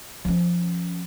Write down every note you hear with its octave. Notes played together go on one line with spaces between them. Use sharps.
F3 C#4